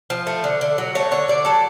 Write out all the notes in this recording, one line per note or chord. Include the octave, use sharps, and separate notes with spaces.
F3
A3
D3
D3
F#3
A3 C#5
D3 C#5
D3 D5
F#3 A4